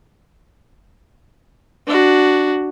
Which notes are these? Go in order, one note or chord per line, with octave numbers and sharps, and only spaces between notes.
D4 F#4